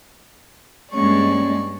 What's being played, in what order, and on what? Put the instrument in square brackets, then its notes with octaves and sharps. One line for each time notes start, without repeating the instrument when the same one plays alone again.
[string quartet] G2 D5 C#6 [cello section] G#3 [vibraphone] A#3 C#4 C#5